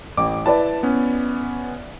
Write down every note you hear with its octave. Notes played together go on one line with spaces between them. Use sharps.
A1 D6
E4 B4 D5 A5
B3 C#4